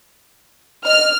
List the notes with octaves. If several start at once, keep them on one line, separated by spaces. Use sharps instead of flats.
D#5 F6